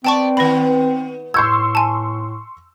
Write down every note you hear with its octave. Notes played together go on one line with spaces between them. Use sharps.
B3 C4 D5 G5 A5 C#6
D#3 B3 B4 B5
A2 C6 C#6 E6 G6 G#6
G#5 A5